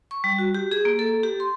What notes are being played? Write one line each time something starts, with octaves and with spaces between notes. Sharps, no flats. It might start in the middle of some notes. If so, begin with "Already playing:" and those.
C#6
G3
F#4
G4
G#4
A#3
A4
G4
C6